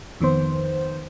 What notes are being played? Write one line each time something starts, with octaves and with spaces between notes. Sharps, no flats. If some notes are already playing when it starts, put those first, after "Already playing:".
F2 D#3 B3 C5